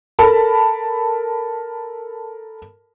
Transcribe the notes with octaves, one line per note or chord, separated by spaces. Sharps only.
A4 A#4 A5 B5